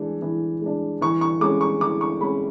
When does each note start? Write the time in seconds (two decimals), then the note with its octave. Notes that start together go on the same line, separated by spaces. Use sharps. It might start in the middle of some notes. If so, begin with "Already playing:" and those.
Already playing: E3 G#3 D4
0.22 E3
0.62 G#3 D4
1.01 E3 C#6
1.21 C#6
1.41 G#3 C#4 D6
1.61 C#6
1.81 E3 D6
2.01 C#6
2.21 G#3 C#4 B5